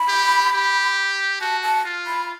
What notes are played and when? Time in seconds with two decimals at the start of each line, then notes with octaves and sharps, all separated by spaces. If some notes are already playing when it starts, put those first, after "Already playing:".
Already playing: B5
0.08 G4
0.53 G4
1.41 F#4 A5
1.63 A5
1.85 F4
2.07 B5